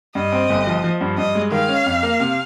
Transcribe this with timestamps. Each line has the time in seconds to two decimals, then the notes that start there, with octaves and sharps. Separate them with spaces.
0.15 G2 D#5
0.32 C4
0.50 G1
0.67 F3
0.84 F3
1.01 G2
1.18 G2 D#5
1.35 G#3
1.52 D#3 F5
1.69 C#4
1.86 F2
2.03 A#3
2.20 C3